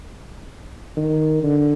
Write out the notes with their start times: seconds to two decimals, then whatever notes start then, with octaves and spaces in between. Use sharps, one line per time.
0.97 D#3
1.43 D3